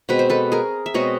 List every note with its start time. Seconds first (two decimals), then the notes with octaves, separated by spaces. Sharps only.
0.09 B2 G#3 C4 B4
0.19 C5
0.29 A4 B4
0.52 G#4 A#4
0.86 E5
0.94 B2 G#3 C4 C#5 D#5